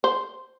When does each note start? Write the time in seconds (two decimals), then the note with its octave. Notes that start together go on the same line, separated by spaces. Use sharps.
0.04 C5